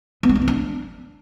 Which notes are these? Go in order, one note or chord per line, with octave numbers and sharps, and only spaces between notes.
B3
G#3
D#4
C4
D4